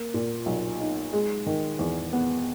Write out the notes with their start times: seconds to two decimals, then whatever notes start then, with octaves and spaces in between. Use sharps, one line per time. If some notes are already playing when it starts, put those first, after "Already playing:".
Already playing: A#3
0.14 A#2
0.46 B1
0.80 D#4
1.13 G#3
1.46 D#3
1.79 E2
2.13 B3